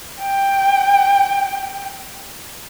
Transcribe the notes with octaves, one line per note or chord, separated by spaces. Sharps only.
G5